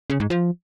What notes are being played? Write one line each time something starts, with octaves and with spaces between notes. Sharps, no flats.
C#3
G#2
F3